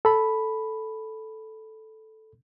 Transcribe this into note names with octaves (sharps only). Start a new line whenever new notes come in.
A4 B5